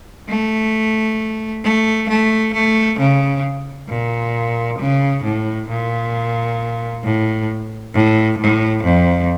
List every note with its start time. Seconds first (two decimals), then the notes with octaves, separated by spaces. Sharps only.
0.29 A3
1.64 A3
2.09 A3
2.54 A3
2.99 C#3
3.89 A#2
4.79 C#3
5.24 A2
5.69 A#2
7.04 A2
7.94 A2
8.39 A2
8.84 F2